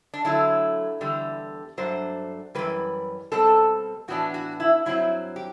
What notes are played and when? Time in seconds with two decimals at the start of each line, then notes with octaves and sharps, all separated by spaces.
0.14 D4
0.24 D3 F#3 A3 E4
1.01 E2 D3 G3
1.78 G2 F#3 A3 D4 C5
2.55 F#2 E3 G3 B4
3.32 B2 G3 C4 A4
4.08 A2 E3 B3 D4 F#4
4.34 F#4
4.60 E4
4.86 G2 F#3 C4 E4
5.36 G4